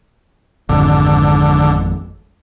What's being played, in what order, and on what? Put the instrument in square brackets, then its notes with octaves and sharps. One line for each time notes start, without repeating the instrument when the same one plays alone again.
[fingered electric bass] G#1 F2 G#2 [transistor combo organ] D3